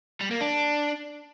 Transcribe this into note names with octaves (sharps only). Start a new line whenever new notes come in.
G3
A#3
D4